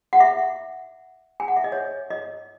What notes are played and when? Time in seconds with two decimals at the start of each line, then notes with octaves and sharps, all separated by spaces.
0.13 F#5
0.20 E5
1.40 G#5
1.48 F#5
1.56 E5
1.64 D#5
1.72 C#5
2.10 D#5